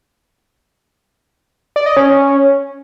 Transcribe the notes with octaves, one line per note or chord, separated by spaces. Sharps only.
D5
D#5
C#4